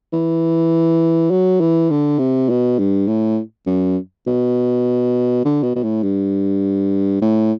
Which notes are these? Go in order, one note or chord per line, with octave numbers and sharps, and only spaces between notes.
E3
F#3
E3
D3
C3
B2
G2
A2
F#2
B2
D3
B2
B2
A2
G2
A2